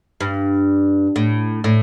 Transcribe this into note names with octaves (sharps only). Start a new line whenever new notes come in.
G2
A2
A2